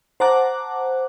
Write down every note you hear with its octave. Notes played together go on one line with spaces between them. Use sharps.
C5 F#5 A5 A#5 D6 F#6